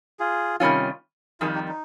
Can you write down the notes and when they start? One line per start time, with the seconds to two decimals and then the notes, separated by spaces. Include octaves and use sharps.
0.20 F4 G#4
0.60 C3 D#3 G3 C#4 F4
1.40 F2 D#3 G3 F4 G#4
1.55 D#4 G4
1.68 D#4